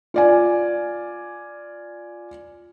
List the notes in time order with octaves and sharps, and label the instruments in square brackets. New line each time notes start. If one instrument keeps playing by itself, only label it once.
[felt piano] F4 D5 G#5